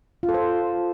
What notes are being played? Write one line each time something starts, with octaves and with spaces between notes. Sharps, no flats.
F4
A4
C5